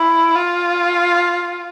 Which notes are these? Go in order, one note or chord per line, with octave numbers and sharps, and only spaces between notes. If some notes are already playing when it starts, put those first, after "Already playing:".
Already playing: E4
F4